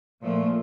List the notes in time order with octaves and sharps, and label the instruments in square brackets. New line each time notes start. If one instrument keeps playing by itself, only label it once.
[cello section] A#2 F3 A3